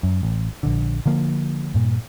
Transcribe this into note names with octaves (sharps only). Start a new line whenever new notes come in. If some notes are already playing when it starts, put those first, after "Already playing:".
F#2
A1
A#1 D3
D3 F3 A#3
G2 A#2